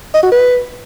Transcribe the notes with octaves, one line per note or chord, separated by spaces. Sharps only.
D#5
F#4
B4